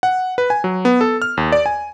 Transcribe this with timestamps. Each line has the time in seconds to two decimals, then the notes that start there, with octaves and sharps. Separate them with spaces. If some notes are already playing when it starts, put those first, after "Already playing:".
0.03 F#5
0.38 B4
0.50 G#5
0.64 F#3
0.85 B3
1.01 A4
1.22 F6
1.37 D#2
1.52 D5
1.66 G#5